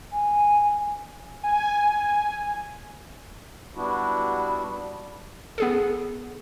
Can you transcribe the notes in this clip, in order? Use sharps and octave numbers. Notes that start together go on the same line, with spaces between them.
G#5
G#5
G3 B3 D4 E4 F#4
B3 G#4 A4